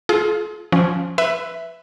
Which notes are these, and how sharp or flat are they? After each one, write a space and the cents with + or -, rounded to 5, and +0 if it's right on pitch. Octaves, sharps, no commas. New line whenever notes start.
F4 +0 G#4 +40
F3 +0 C#4 +0
B4 +0 E5 +0 B5 +25